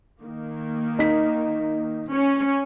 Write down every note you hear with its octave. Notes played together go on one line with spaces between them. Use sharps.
D#3 A#3
D#4 B6
C#4 C#5